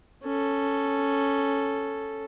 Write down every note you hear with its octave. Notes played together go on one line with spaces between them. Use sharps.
C#4 A4